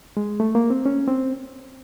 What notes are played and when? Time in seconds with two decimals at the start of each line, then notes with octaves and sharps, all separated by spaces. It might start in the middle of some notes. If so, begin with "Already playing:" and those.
0.17 G#3
0.40 A3
0.55 A#3
0.70 C4
0.86 C#4
1.08 C4